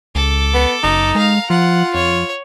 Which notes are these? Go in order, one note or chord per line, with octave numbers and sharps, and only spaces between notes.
C#2 A4 D6
B3
F#1 D#4
G#3 F5 A#5
F3 F4 F#5
F2 C#5